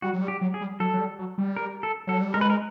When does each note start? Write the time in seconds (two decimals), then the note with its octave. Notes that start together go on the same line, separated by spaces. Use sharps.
0.02 G3 F#4
0.13 F#3
0.21 G3
0.28 G4
0.41 F#3
0.54 G#4
0.61 G3
0.80 F#3 A4
0.94 F#3
0.99 G3
1.19 F#3
1.38 G3
1.56 A#4
1.83 A4
2.07 F#3 A4
2.21 G3
2.34 G#3 A#4
2.41 B4
2.50 A#4